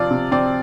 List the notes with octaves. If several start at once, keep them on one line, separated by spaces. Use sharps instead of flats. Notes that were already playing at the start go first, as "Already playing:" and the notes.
Already playing: C3 F3 F4 D5
C3
C4 D5